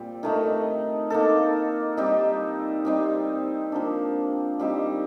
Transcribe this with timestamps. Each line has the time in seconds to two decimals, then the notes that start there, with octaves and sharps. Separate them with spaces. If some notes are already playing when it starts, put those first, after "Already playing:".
Already playing: A#2 G3 C4
0.23 D#3 A3 D#4
1.10 A#3 D#4 A4
1.97 G3 C4 D#4
2.85 G3 C4 D#4
3.72 F3 A#3 D4
4.59 G3 C4 D#4 G4